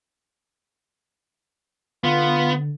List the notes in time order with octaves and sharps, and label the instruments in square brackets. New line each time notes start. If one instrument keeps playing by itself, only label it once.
[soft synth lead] D3 [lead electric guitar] B3 [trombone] F4